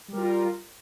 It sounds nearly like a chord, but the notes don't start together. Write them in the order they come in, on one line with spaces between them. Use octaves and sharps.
G3 A#4 F4